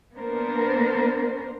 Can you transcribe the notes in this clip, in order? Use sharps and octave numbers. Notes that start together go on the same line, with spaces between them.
A#3 B3 D4 A#4 C5